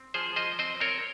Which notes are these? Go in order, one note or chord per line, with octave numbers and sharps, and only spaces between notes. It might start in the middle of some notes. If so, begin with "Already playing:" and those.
Already playing: C4
F3 G#4 C5
F3 C5 D#5
C4 C5 D#5
C4 A#4 C#5